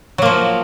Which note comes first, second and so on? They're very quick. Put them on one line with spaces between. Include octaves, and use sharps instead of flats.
F#3 A#3 F3